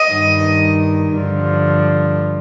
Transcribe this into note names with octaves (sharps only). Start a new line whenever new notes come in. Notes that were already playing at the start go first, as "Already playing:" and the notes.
Already playing: D#5
G2 D#3
G2 D3 F3